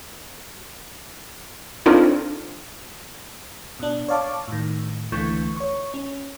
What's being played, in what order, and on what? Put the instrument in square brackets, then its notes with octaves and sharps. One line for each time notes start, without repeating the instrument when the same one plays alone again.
[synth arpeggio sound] C4 D4 D#4 F4 A4 C5
[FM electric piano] B2 D4
C#5 D5 F5 A5 C#6 D6
A2 D#3
C#2 D3 E3 A3 C#6 G6
C#5 C#6
C#4